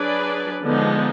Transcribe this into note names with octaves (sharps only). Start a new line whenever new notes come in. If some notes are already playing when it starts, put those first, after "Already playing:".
Already playing: F#3 D4 G#4 B4 D5
D3 F3 G#3 B3 D#4